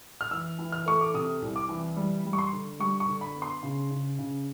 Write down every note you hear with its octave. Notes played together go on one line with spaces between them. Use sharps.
F6
E3 E6
E3
F6
A3 C#6
D6
C3 D#6
C2
D6
E3
G3
G3
C#6
C6
D3
G3 C#6
C#6
D3
B5
B3
C6
C#3
C#3
C#3